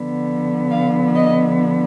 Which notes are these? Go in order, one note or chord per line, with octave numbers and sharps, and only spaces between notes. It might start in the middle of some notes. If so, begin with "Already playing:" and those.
Already playing: D3 F3 B3
F5
D#5